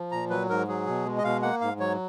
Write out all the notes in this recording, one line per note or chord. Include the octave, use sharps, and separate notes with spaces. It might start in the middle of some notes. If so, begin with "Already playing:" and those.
Already playing: F3
A#2 A#5
F#3 B4
G#2 A#4
F#3 G#4
B2
G#3
D#5
B2 F5
A#3 F#5
G#2 F5
F#3 C#5